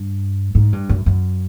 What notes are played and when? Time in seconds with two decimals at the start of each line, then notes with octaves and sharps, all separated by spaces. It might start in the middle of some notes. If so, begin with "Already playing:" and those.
Already playing: G2
0.55 G#2
0.73 G2
0.89 F#2
1.06 F#2